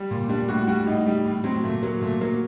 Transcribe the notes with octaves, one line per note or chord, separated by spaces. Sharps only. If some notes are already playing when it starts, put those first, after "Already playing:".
Already playing: G3
A#2
G3 D4
A2 F#4
G3 F#4
A2 D#4
G3
A2
F#3 C4
A#2 A3
F#3 A#3
A#2 A3
F#3 A#3